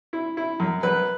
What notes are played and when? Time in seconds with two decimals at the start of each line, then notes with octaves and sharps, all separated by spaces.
0.13 E4
0.37 E4
0.60 F#2
0.83 F#2 B4